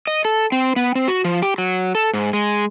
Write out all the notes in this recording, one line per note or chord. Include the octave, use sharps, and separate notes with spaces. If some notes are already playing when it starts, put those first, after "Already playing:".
D#5
A4
C4
B3
C4
F#4
F3
G4
F#3
A4
G#2
G#3